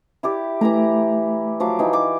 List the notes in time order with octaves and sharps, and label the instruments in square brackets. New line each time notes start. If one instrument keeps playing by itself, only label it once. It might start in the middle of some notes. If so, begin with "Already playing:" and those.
[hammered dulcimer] E4 G4 D5
[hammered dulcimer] E3 E4 A#5 [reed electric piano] A3
[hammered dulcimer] F3 F#3 D6
E3 D#4 G5
D5 D6